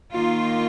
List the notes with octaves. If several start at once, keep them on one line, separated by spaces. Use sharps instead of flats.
D#3 A#3 F4